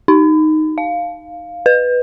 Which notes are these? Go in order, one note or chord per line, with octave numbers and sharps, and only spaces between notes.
D#4
F5
B4